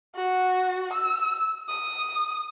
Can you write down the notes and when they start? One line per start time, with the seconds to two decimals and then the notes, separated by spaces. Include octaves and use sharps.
0.16 F#4
0.93 E6
1.69 D#6